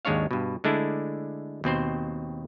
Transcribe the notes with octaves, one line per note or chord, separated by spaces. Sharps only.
G#1 D#2 G#3 D4 C#5 F5
G2 B2
D3 G#3 A3 D4 E4
D#2 B2 C4 C5